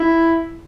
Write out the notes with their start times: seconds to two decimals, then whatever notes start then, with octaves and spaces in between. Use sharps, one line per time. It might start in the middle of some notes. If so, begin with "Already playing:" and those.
Already playing: E4